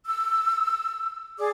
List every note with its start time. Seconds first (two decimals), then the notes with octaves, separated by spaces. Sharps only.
0.06 E6
1.38 G#4 D5 D6